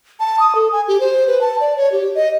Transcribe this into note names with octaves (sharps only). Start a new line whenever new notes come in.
A5
D#6
A4
G#5
G4
C5
B4
A5
D5
C#5
G4
D#5